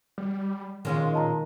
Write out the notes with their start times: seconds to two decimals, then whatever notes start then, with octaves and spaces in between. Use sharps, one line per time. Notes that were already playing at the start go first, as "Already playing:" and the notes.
0.18 G3
0.85 A#2 D#3 G#3 C#4 F4
1.13 D#5 A5 A#5